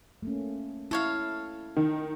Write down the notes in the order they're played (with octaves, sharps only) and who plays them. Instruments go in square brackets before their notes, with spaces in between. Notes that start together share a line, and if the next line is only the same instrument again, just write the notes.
[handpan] A3 A#3 C#4
[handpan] E4 [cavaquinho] A4 C#5 F5
[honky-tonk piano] D#3